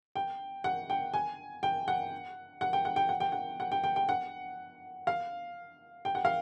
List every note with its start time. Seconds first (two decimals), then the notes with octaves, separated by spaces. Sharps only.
0.15 G5
0.64 F#5
0.90 G5
1.14 G#5
1.63 G5
1.88 F#5
2.61 F#5
2.73 G5
2.85 F#5
2.96 G5
3.09 F#5
3.20 G5
3.32 F#5
3.60 F#5
3.72 G5
3.84 G5
3.96 G5
4.09 F#5
5.07 F5
6.05 G5
6.15 F#5
6.25 F5